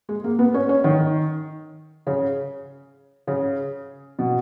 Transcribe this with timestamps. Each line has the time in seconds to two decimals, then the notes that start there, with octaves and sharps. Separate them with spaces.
0.09 G#3
0.24 A#3
0.39 B3
0.54 C#4
0.69 C#4
0.84 D#3
2.07 C#3
3.27 C#3
4.19 B2